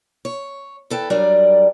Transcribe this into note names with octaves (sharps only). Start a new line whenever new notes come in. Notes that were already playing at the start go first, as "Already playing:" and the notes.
C#5
E2 A4 B4 G5
F#3 G3 D4 A#4 D5